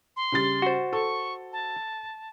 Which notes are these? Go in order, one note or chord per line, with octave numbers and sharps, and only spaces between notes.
C6
C#3 G3 A6
F#4 C5
A4 C#6
A5